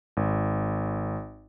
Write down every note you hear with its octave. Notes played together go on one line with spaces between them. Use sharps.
G#1